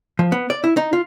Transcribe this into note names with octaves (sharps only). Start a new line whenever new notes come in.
F3
B3
D5
E4
D#4
F4